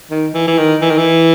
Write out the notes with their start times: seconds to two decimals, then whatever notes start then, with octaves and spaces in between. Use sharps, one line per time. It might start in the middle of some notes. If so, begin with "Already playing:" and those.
0.11 D#3
0.34 E3
0.47 E3
0.58 D#3
0.82 E3
0.90 D#3
0.98 E3